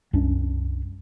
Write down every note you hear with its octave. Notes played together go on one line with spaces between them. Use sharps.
C2 F#2 C#4 D4